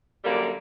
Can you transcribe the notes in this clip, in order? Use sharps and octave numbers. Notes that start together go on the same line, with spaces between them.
F#2 D3 G3 A#3